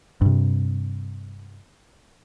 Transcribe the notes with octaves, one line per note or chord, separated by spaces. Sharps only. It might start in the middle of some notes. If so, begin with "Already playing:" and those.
G2 C3